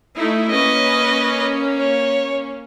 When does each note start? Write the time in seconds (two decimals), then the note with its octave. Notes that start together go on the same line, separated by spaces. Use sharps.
0.16 A3 D#4 E4
0.50 A#3 C#4 B4 D#5
1.78 C#5